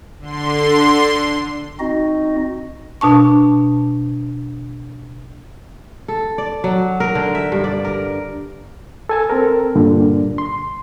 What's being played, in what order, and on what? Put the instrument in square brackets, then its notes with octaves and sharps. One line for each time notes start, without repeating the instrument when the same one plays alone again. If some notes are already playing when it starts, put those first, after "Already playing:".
[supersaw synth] D3 C6
[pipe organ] C4 D#4 F#4 D#5
[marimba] B2 D4 A5 C#6
[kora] A4
D5
F#3
A#4
D3
E5
G2
D5
A#4
[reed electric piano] A4 G#5 A5
C4 A4 A#4
G2 A#2 D3
C6